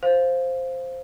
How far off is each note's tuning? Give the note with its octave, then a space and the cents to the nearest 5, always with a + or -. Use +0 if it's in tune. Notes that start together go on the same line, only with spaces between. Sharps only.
C5 +0 F5 +0